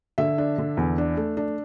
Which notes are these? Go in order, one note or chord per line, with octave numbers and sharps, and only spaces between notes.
D3 E5
D4
D3
E2
D4
A3
D4